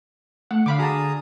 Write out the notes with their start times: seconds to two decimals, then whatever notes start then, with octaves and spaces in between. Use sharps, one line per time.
0.51 A3 F#5
0.66 D3 F5 B5 D6
0.79 F#4 G#4 A5 A#5 D#6